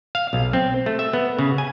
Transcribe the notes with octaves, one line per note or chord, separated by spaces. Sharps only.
F5
B1
C4
A3
E5
B3
C#3
G#5